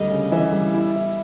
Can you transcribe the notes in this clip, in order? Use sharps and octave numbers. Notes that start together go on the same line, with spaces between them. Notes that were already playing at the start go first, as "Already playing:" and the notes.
Already playing: D2 G3 D#5
C#3
E3 E5
G3
E4
E4